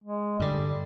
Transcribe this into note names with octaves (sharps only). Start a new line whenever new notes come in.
G#3
G2 D3 G3